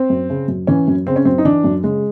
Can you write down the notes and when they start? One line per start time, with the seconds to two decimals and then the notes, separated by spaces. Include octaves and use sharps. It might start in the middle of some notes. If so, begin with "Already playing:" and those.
Already playing: C4
0.10 F#2
0.30 C#3
0.48 F#2
0.67 E3 C#4
0.88 F#2
1.07 C#3 C4
1.16 C#4
1.25 F#2 C4
1.38 D#4
1.45 E3 D4
1.64 F#2
1.84 C#3 G#3